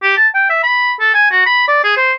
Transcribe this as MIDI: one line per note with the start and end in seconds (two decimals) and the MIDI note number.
0.02 0.14 67
0.18 0.28 81
0.34 0.45 79
0.50 0.59 76
0.63 0.92 83
1.00 1.09 69
1.14 1.28 80
1.31 1.43 66
1.46 1.64 83
1.68 1.80 74
1.84 1.94 68
1.97 2.12 72